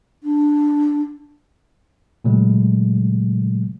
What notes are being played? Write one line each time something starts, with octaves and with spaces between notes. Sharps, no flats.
D4
A#2 C#3 F#3 G#3 A3